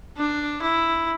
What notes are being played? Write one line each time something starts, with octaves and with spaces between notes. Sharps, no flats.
D4
E4